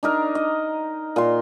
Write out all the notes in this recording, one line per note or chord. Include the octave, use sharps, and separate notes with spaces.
D4 D#4 A#4
D#5
A#2 C6